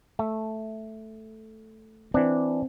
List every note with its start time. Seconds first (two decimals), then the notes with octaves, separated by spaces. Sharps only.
0.19 A3
2.14 E3 C4 D4